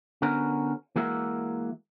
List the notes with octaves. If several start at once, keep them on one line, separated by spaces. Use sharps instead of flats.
D3 B3 C#4 F#4 A#4
E3 G#3 A#3 F#4 A#4 E5